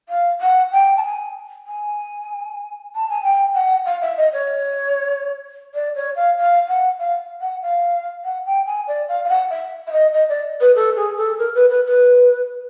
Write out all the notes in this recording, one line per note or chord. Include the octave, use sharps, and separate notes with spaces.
F5
F#5
G5
A5
G#5
G#5
A5
G#5
G5
F#5
F5
E5
D#5
C#5
D5
C#5
F5
F5
F#5
F5
F#5
F5
F#5
G5
G#5
D5
F5
F5
F#5
E5
E5
D#5
D#5
D5
B4
A4
G#4
A4
A#4
B4
B4
B4